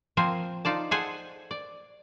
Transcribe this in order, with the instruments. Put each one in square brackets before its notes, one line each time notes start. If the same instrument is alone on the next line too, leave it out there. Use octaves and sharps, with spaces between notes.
[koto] F3 A#3 C4 A#4 C5 G#5
D#4 F4 D5 A5
G#4 A4 C5 F#5 G#5
D5